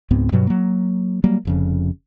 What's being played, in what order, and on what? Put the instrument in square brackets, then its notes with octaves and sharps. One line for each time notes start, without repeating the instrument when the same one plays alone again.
[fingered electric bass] C#2 G#2 B3 C4
G2 B2 F#3
F#3 A#3
F#3 G3 A#3
F1 F2 C#3